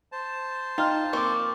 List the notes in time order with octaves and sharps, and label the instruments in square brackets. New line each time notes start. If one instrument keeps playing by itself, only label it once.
[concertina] C5 A5
[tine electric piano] D#4 [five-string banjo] F4 [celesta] G5 F6
[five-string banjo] F3 A#3 C4 [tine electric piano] C#6 D6